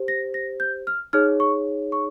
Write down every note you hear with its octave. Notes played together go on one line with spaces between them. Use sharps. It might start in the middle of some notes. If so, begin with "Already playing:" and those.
Already playing: G4 C5
A#6
A#6
G6
F6
D#4 G#4 C#5 F6
C#6
C#6